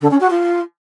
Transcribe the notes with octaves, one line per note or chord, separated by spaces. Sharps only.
D3
C#4
F#4
F4